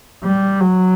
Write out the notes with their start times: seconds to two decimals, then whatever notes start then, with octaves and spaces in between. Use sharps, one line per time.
0.24 G3
0.61 F#3